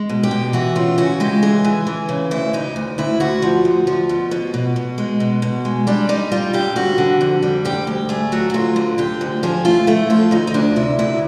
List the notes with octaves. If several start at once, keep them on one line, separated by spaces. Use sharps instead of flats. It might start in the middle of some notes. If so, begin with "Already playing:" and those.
Already playing: G#3
B2
G4
B2
E3 F#4
C#3 F4
C#3 F#4
G#3 G4
E3 G#4
E3
E3
C#3
D2 E4
D2 D#4
D2
D2 E4
D2 F#4
F3
D2
F3
B2
B2
B2
B2
G#3
B2
B2
G#3
G3 D4
G3 D#4
G3 F4
D3 G4
F2 F#4
D3
F2
G3
D2 G4
D2
A3 G#4
F#3 F#4
F#4
D2 F4
D3
D3 G4
D2
F3 G#4
A3 F4
A3 E4
F3 F4
D2 D#4
D#4
D2 D4
C3 E4
D2 E4